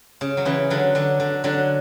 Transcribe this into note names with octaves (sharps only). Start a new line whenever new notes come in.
C#3
F#3
C#3 E3
D3 F#3
D3 F#3
D3
D3 F#3